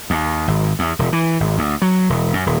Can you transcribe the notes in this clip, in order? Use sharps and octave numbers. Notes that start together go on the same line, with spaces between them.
D#2
G#1
E2
E1
E3
G#1
D2
F#3
E1
F#2
D#1